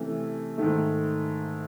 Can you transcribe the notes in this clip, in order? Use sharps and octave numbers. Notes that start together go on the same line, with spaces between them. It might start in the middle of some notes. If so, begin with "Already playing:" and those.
Already playing: C3 E3 A3 C#4
G#2 D#3 A3